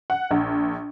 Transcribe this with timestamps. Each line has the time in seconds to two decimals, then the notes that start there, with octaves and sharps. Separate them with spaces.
0.10 F#5
0.31 A#1